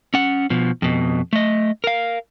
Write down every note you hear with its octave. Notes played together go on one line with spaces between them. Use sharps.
C#4 F#5
B2 F3
F2 B2
A3 D#5
A#4 F5